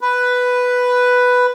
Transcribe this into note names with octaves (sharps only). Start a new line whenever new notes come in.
B4